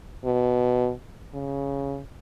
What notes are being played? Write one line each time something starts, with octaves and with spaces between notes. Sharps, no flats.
B2
C#3